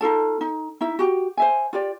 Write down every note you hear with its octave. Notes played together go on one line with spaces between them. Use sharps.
D#4 F4 A4 A5
D#4
D#4 E4 E5
F#4 G4
C5 E5 G#5
F4 G4 D5